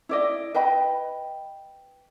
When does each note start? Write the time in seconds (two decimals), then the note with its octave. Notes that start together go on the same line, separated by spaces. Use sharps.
0.09 E4 D5 D#5
0.54 B4 D#5 G5 B5